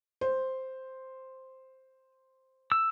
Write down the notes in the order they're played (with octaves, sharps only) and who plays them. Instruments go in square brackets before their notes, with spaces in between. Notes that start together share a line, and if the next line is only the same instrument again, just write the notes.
[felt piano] C5
[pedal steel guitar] E6